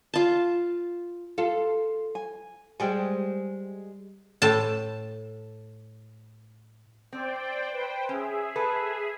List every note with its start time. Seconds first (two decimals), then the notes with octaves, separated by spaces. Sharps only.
0.14 F4 A5
1.38 F4 A4 F5
2.15 G#5
2.80 G3 G#3 C5 G5 G#5
4.42 A2 A5
7.13 C4 C5 D5 G5
7.72 B4 C5 G5
8.09 C#4 G#4 E5
8.56 A4 B4